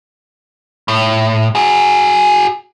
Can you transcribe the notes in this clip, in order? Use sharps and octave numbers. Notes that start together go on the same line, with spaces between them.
A2
F#4 G#4